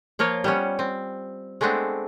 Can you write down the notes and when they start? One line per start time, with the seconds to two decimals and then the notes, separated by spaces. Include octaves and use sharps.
0.19 F3 A#3 F4 C#5
0.44 G3 B3 C#4
0.79 C4
1.61 G#3 A3 B3 C4 D4